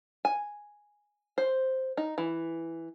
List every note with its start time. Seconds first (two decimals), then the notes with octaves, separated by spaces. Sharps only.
0.25 G#5
1.38 C5
1.97 D#4
2.18 E3